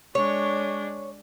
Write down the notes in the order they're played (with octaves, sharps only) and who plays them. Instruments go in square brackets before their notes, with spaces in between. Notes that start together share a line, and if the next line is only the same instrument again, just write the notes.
[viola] G#3 D4 [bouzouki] C#5